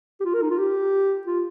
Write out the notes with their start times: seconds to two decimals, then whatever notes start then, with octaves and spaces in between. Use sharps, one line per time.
0.20 G4
0.25 F4
0.34 A#4
0.42 D#4
0.50 F4
0.58 G4
1.27 F4